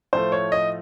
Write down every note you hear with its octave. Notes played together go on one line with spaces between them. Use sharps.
A2 F3 A3 C5
C#5
D#5